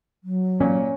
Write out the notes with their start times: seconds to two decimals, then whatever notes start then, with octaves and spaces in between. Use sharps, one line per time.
0.24 F#3
0.60 A#2 C#4